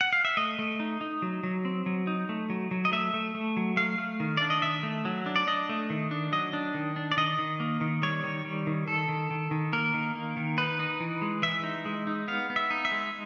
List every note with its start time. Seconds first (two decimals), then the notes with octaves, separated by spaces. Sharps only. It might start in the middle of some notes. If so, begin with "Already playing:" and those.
0.01 F#5
0.13 F5
0.25 E5
0.37 A3 D#5
0.59 A3
0.80 D#4
1.01 D#4
1.22 F#3
1.43 F#3
1.65 C4
1.86 F#3
2.07 D#4
2.29 A3
2.50 F#3
2.71 F#3
2.85 D#5
2.92 A3 E5
3.14 A3
3.35 A3
3.57 F#3
3.77 A3 F5
3.98 A3
4.20 D#3
4.37 D4 D5
4.50 D#5
4.62 D#3 E5
4.83 A3
5.05 F#3
5.26 D4
5.36 D5
5.47 D4 D#5
5.69 A3
5.90 D#3
6.11 D4
6.32 F#3 D#5
6.53 D4
6.74 D#3
6.96 D4
7.12 D5
7.17 D#3 D#5
7.39 D#3
7.60 A#3
7.81 D#3
8.03 G3 C#5
8.24 D#3
8.45 G3
8.67 D#3
8.88 D#3 A4
9.09 D#3
9.30 D#3
9.51 D#3
9.73 A#3 A#4
9.94 D#3
10.15 A#3
10.37 D#3
10.58 D#4 B4
10.79 D#4
11.00 E3
11.22 G#3
11.42 E3 E5
11.64 D#4
11.85 G#3
12.07 D#4
12.28 B3 F5
12.50 B3
12.56 E5
12.71 D#4
12.85 E5
12.92 G#3